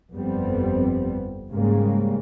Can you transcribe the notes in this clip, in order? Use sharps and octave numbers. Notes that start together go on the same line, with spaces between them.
G1 F2 G3 B3 C4
G#2 C#3 G3 G#3 A#3